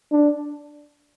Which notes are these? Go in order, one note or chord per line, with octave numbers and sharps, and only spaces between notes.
D4